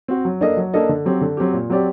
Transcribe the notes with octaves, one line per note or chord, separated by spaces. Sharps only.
C4 F#4
F#3
A#3 D4 A4 D#5
F#3
A#3 D4 A4 D#5
D3
F#3 C4 G4
D3
F#3 C4 G4
A#2
F#3 C4 G4 D5